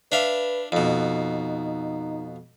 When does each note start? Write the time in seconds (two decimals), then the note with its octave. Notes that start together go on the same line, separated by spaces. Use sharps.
0.12 D4 B4 E5 F5
0.72 F2 B2 D#4